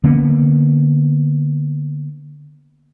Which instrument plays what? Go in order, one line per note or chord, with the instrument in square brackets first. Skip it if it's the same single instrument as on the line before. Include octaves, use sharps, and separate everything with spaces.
[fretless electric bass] D3 A#3 B3 C#4